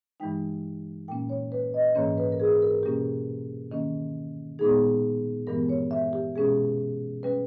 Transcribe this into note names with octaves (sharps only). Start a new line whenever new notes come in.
G2 E3 G#3 D#4 G5
A#2 A#3 C#4 G5
C#5
B4
D#5
G#2 E3 A#3 C#4 C#5
B4
A#4
G#4
A#4
B2 G3 A#3 C#4 G4
D#3 A#3 C#4
A#2 G#3 B3 D#4 G#4
G2 E3 G#3 B3 A#4
C#5
E5
G4
B2 G#3 C#4 G#4
G3 C#4 B4